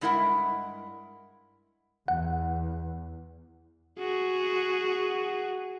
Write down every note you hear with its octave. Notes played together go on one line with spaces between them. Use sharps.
G2 G#3 E4 A#4 E5 F#5
E2 F#5
F#4 G#4